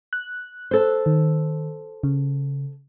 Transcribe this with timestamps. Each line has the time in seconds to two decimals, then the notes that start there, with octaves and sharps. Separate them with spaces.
0.13 F#6
0.71 A4 C5
1.06 D#3
2.03 C#3